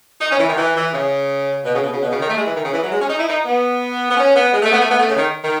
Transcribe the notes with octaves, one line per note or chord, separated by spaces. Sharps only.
D#4
C#4
E3
D#3
E3
E3
C#3
B2
C#3
B2
C#3
B2
C#3
D#3
A3
G#3
E3
D#3
C#3
E3
F#3
G#3
C#4
D#4
E4
D#4
B3
B3
C#4
B3
G#3
A3
B3
A3
B3
A3
C#3
D#3
D#3